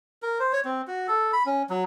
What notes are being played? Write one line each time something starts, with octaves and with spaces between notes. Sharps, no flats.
A#4
C5
C#5
C4
F#4
A4
B5
C#4
F#3